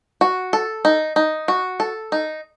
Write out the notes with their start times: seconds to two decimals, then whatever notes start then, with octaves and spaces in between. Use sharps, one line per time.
0.21 F#4
0.53 A4
0.85 D#4
1.16 D#4
1.48 F#4
1.80 A4
2.12 D#4